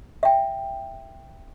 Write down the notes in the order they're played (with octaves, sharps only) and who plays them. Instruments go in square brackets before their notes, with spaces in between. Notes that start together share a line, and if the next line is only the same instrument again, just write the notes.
[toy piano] E5 G5